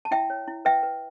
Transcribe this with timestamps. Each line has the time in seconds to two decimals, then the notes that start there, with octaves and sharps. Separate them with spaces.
0.05 A5
0.11 E4 E5 G5
0.30 C#5
0.48 E4
0.65 B4 E5 G5
0.83 B4